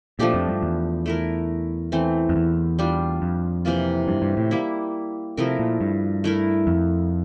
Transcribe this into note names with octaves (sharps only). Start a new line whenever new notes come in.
A#2 F3 A3 D4 G4
F2
G2
E2
A3 E4 A#4
E3 A3 C4
F2
E2
G3 D4 F4
F2
C3 E3 A#3 F4
G2
G2
A2
G3 A#3 E4
C3 F3 A3 E4 A#4
A#2
G2
A3 E4 A#4
F2